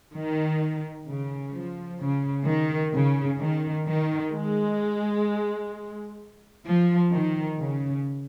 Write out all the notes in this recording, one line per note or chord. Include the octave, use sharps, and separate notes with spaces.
D#3
C#3
F3
C#3
D#3
C#3
D#3
D#3
G#3
F3
D#3
C#3